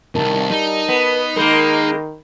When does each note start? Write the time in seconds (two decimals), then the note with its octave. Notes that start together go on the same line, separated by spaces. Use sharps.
0.15 C2 F2 D#3 A#4 A5
0.50 G3 D#4
0.88 B3 B4
1.36 D#3 G#3 A#3 A#4 B5 G6